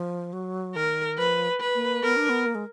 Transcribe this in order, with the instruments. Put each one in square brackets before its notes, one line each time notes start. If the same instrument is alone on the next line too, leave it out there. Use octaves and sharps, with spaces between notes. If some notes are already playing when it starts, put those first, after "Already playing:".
Already playing: [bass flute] F3
F#3
[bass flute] D#3 [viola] A#4
[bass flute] F3 [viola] B4
[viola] B4
[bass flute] A#3
[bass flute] B3 [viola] A#4
[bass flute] D4
B3
A#3
G#3